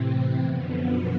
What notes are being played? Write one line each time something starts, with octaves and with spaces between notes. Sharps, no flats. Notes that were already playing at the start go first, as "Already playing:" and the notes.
Already playing: A2 C3 E3 C4
F#2 B2 D3 F3 B3
A#2 A#3